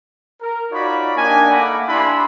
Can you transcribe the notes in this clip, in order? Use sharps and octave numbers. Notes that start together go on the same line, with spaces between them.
A#4
D#4 F4 F#4 C#5 D5 B5
A#3 D4 D#4 G4 G#5
A3 A#3 F#5 A#5 B5 D6
D4 E4 G4 G#5 B5 C6